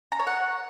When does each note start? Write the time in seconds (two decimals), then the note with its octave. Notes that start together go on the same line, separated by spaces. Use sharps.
0.12 A#5
0.19 C#5
0.27 F#5